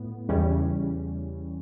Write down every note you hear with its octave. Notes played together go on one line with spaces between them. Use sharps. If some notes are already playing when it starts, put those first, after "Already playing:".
Already playing: A2 B3
E2 C#3 E3 G3 C#4